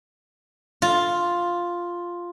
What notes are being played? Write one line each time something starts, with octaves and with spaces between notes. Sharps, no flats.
F4